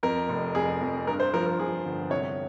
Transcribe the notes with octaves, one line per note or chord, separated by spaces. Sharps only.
F2 A#4
F1
F2 G#4
F2
G2 A#4
C5
F3 A#4
A#4
F3 G#4
G1
C2 C#5